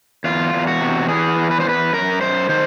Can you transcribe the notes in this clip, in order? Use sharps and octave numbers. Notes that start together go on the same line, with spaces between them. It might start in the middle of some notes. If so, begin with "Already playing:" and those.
E2 F4
E2
F#4
C3
E3 G#4
E2
B4
C5
E2 B4
F#2 A#4
F#2 C5
D#3 C5